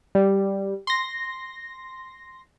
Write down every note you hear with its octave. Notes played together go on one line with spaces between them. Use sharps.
G3
C6 A#6